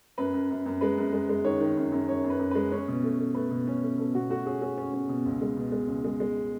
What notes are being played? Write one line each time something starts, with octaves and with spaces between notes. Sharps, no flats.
F#2 B4
F#2
F#2
F#2
G#3 B4
F#2
G#3
G#3
D#3 C#5
D#3
F#2
F#2
F#2 C#5
F#2
B4
F#2
G#3 B4
C#4 C#5
B2
A3
A3
A3 B4
B2
C#4
A3
B2 A4
B2 F#4
A3 F#4
C#4 G#4
C#4 G#4
C#4
C#4
B2
C#2
G#3
B2
G#3
C#2
G#3
G#3